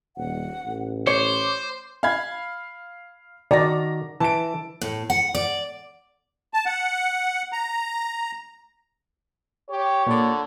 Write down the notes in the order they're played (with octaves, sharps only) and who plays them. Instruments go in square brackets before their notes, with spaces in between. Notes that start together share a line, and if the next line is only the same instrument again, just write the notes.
[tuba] D#1 [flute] F#5
[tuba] A1
[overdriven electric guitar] C5 [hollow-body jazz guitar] C#5 [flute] D6
[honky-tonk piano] F5 B5 G#6
[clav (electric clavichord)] D#3 F#4 [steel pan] D5 [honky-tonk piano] A#5 A#6
[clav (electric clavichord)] E3 [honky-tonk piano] A5 D7
[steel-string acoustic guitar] A2
F#5
D5
[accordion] A5
F#5
A#5
[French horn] G4 [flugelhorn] C#5
[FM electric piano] A#2 D5 [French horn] D3